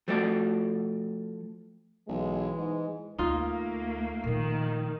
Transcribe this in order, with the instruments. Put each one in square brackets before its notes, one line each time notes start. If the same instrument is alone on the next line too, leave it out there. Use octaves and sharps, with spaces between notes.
[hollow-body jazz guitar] F3 A3 F#4 D5
[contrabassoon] B1 [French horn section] E3 G#3
[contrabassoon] G#2
[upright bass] D2 [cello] A3 A#3 [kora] D#4 F4
[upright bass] A#2 F3 [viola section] D#3